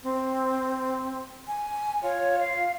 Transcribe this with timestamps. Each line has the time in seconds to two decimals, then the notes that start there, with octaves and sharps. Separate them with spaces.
0.03 C4
1.47 G#5
2.03 F4 C#5
2.40 F5